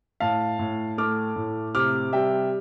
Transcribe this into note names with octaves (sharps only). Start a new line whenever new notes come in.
A2 F5 A5
A2
A3 D6 F6
A2
C3 D6 F6
G3 E5 G5